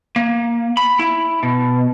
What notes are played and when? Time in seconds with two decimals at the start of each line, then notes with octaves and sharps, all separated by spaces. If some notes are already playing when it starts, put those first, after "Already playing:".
0.16 A#3
0.77 B5
1.00 E4
1.43 B2